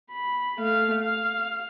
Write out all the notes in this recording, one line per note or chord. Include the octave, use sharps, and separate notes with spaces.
B5
A3 F5
F5